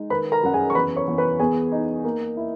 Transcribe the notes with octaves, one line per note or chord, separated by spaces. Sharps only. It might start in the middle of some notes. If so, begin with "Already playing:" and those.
Already playing: G#3 D#4
D#3 B4 B5
A#4 A#5
F#2 F#5
G#4 G#5
C#6
E2 B4 B5
C#5 C#6
E2
B4 B5
B3 G#4 G#5
D#4
A#3
E4